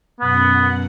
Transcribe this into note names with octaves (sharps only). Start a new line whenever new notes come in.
F#2 B2 B3 F#5